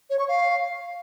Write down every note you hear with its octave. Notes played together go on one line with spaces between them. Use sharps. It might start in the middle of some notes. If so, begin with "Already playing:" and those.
C#5
C#6
F5